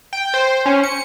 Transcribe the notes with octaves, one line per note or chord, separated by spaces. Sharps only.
G5
C5
C#4
C#7